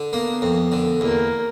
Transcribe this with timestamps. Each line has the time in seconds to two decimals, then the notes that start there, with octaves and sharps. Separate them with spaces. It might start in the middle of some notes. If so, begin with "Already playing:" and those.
Already playing: D3
0.13 A#3 B3
0.42 F2
0.72 D3
1.01 E2 A#3